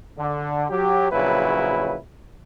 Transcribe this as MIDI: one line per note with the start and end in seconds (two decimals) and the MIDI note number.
0.18 0.65 50
0.69 1.09 54
0.69 1.09 67
1.12 1.96 34
1.12 1.96 49
1.12 1.96 54
1.12 1.96 64
1.12 1.96 71